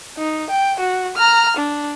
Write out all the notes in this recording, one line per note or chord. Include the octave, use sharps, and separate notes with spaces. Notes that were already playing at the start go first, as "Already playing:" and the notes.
D#4
G5
F#4
A#5 F6
D4